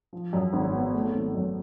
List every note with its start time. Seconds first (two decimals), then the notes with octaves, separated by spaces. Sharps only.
0.13 F3
0.33 F#2
0.53 G#1
0.74 B3
0.94 A3
1.13 G#1
1.35 F#2